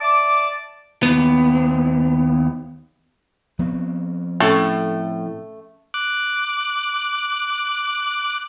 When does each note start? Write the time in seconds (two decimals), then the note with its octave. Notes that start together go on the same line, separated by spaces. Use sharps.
0.01 D5 E5 A5 D6
1.03 D#2 B3
3.59 F3 B3 C4
4.40 A2 A3 C#4 A4 C#6
5.94 D6 F#6